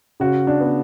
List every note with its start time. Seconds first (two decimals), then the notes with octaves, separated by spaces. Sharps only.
0.20 C#3 F#4
0.47 D4
0.60 B3